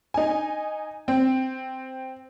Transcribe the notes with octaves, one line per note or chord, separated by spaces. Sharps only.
D#4 G#5
C4